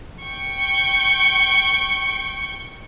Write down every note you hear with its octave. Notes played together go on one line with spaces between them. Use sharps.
G5 C#6